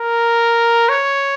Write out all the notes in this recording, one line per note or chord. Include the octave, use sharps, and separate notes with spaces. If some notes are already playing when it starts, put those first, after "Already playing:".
Already playing: A#4
C#5